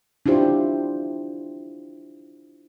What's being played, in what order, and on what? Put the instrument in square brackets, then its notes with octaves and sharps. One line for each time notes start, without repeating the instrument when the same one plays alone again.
[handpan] D4 E4 F4 G4 C5